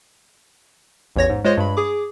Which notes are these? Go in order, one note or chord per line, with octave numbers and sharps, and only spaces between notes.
A1 E2 C#5 A#6
G#2
G#3 F4 C5 C#5 D#5
G2 B5
G#4 D6